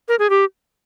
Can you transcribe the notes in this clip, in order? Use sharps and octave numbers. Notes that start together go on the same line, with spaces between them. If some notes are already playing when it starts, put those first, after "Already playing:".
A#4
G#4
G4